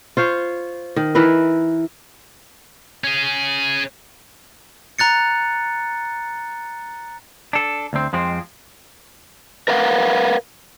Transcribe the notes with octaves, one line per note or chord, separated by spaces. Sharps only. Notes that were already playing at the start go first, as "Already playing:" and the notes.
F4 C5 C#5
D#3
E3 E4 A#4 B4
C#4 G#4
A#5 F#6 A6 C#7
D4 A4
D2 C4
F2 F3 G#3 C4
A#4 B4 F5 F#5